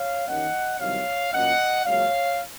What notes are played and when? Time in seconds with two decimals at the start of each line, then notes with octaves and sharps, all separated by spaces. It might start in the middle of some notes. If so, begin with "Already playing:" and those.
Already playing: C#5 F5
0.28 D#2 D#3 A#3 C#4 D#5 F#5
0.80 C2 C3 D#3 F#3 C#5 F5
1.33 A#2 F#3 A#3 C#4 D#5 F#5
1.85 C#2 C#3 F#3 A#3 C#5 F5